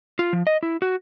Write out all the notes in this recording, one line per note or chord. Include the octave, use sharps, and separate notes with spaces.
F4
F3
D#5
E4
F#4